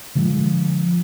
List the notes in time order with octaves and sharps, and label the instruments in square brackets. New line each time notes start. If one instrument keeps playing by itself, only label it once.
[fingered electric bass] D3 F3 G#3